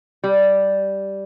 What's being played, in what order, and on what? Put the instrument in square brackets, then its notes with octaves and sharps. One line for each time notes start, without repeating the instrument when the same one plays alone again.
[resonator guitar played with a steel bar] G3